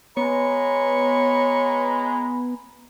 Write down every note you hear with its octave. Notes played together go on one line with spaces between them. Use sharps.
G#3 B3 C#5 A#5 B5